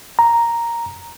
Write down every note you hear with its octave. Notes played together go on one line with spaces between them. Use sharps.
A#5